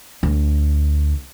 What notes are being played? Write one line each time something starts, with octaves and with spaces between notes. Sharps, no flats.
D2